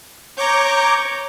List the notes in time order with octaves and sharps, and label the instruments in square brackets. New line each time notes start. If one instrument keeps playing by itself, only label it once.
[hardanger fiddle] C#5 [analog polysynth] A#5 D6 G6